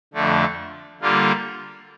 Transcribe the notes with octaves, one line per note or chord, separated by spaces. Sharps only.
F2 D3 A3
D3 G3 A#3 F4